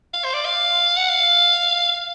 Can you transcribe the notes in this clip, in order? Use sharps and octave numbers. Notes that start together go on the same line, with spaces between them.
F5
C5
D5
F5
F#5
F5